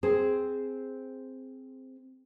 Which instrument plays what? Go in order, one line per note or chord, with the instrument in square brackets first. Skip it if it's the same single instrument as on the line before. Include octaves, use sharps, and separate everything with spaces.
[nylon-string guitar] C4 G#4 C5